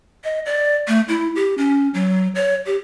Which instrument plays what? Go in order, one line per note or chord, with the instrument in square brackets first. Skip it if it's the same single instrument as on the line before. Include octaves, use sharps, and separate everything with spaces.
[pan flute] D#5
D5
A3
E4
G4
C#4
F#3
C#5
G4